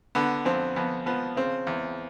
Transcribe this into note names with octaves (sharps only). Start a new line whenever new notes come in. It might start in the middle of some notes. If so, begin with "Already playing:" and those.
D3 B3
F2 C4
F2 B3
F3 B3
C#3 C4
E2